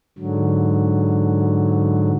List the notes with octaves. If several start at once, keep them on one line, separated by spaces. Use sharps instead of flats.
G#2 D3 F#3